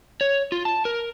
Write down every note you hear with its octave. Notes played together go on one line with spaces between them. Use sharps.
C#5
F4
A5
A#4